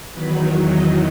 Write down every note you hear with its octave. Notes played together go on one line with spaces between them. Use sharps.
E2 D#3 F#3 B4
C#5
D#5